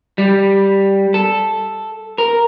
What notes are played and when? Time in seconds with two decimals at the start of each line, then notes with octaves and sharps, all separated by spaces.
0.18 G3
1.14 A4
2.18 A#4